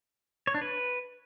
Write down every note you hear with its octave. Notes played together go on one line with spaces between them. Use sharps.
C#5
D4
B4